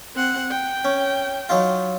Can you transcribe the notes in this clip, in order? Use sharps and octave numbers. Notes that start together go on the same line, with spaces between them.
C4 F#5
G5
C#4
F#3 D#4 F4